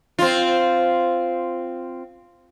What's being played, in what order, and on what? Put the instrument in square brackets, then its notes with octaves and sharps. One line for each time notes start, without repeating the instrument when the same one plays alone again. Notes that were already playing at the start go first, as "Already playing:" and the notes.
[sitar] C4 F4